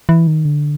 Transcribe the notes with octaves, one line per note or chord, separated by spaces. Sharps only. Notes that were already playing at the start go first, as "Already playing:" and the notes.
E3
D#3
D3